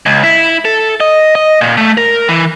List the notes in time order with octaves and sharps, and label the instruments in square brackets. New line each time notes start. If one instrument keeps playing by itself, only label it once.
[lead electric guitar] C#2
E4
A4
D#5
D#5
A#2
A3
A#4
E3